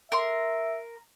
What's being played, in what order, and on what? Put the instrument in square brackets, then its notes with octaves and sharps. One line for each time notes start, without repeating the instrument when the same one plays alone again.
[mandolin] A#4 C6 [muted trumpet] E5